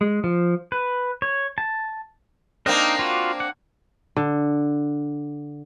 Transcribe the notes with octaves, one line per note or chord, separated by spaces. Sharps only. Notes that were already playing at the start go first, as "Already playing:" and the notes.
G#3
F3
B4
C#5
A5
A#3 C4 D4 D#4 A#4
F4 F#4
F#5
D3